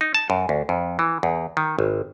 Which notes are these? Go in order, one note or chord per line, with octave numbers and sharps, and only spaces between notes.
D#4
A5
F#2
D2
F2
E3
E2
D#3
G#1